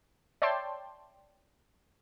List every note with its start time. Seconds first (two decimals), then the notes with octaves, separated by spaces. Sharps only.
0.42 C#5 D5 E5 G5 A5 C6